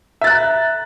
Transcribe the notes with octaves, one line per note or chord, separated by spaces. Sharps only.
E5 A#5 F#6 A6